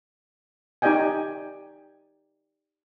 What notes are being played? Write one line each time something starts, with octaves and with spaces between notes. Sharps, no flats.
D#4 G4 D5 D#5 G5 G#5